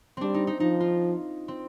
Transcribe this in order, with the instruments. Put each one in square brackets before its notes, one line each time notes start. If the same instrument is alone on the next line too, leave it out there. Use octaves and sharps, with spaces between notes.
[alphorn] G3 [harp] C4 D4
[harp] D#4
D#4
[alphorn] F3 [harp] D#4
[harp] F4
C4